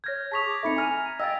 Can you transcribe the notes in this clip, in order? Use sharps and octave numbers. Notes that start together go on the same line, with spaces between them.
C#5 F6 G6 G#6 A#6
G#4 A5 C#6 D#6 A#6 B6 F7
D6
C4 D#4 A4 E5 B5 C#7
G#5 A#5 F6
D#5 F5 G5 E6 A6